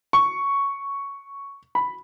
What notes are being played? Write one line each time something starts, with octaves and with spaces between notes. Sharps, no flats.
C#6
B5